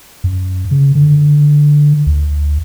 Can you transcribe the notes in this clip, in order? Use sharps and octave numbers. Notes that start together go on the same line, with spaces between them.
F#2
C#3
D3
D2